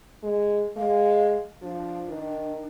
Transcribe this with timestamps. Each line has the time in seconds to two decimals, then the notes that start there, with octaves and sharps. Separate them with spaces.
0.23 G#3
0.77 G#3 F5
1.62 F3 D4
2.09 D#3